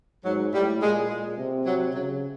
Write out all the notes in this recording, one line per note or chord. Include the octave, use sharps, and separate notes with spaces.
G#2 F#3
A2 G3
A#2 G#3
A#2 G#3
C3
F#3
C#3 F#3